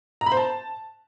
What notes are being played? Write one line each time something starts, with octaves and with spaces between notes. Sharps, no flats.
A#5
B5
C5
A5